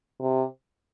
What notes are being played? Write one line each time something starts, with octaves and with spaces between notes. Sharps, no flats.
C3